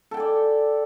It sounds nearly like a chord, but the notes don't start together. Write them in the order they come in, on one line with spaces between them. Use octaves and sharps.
A4 G5 G#5 D5